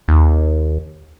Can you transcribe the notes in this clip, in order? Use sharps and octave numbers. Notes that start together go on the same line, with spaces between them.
D#2